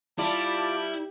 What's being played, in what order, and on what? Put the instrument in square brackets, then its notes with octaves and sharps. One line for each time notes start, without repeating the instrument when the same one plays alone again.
[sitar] G3 [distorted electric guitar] E4 [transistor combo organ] F4 D6 [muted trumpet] A5